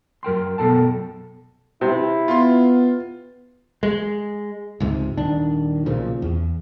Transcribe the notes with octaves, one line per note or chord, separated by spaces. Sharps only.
F#2 A#4 G5 C6
F#2 B2 A4 G5 A5
C3 E4
B3 F4 C6
G#3
C#2 G#2 C3
D#1 D#3 D4
B1 A#2 C#3 F3
E2